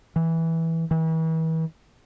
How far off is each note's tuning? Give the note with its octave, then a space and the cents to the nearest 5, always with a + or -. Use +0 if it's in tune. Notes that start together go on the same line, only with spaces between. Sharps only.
E3 -10
E3 -35